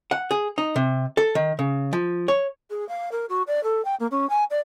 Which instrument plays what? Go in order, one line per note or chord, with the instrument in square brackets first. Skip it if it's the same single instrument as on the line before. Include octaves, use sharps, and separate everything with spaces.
[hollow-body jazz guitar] F#5
G#4
D#4
C3
A4
D#3
C#3
F3
C#5
[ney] G#4
F5
A#4
F#4
D5
A4
G5
A#3
C#4
G#5
D5